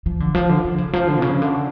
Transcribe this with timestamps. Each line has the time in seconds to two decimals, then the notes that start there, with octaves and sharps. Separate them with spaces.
0.06 F3
0.20 D3
0.35 F3
0.49 D3
0.65 D3
0.78 C#3
0.93 F3
1.08 D3
1.17 B2
1.22 C#3
1.42 D3